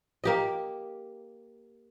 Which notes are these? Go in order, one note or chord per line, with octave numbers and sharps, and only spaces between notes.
A#3 G4 D#5